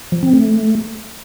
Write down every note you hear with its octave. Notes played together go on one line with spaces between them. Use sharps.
F3
C4
A3